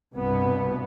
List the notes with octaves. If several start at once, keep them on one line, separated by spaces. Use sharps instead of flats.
C2 G2 B2 B3